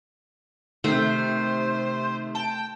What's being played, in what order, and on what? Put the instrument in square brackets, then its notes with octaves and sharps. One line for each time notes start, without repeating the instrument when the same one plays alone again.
[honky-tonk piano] C3 D#3 [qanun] A3 [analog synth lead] C5
[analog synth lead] G5 [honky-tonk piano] A5